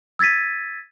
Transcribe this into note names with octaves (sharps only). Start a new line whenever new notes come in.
E6 G#6 A6 B6 D#7